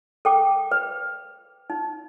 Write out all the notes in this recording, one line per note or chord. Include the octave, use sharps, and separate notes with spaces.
A4 G5 D6
B4
D#4